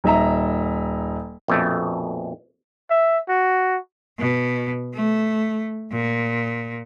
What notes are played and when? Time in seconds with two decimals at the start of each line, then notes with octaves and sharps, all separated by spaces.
0.04 D#1 D#4 E5 A#5
1.48 A#1 F2 B2 A3
2.90 E5
3.29 F#4
4.18 B2
4.94 A3
5.92 A#2